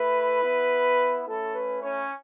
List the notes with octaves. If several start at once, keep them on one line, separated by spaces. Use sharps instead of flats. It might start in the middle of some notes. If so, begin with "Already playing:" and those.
Already playing: A3 E4 B4
B3 E4
A3 C#4 E4 A4
B4
C#4 C#5